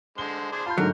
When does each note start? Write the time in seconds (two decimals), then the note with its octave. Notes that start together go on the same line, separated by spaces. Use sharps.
0.18 D3 G#3 C5 G7
0.52 D4 G#4 C5
0.66 F4 A5 B5 G6
0.78 G#2 D3 F#3 A3 A#4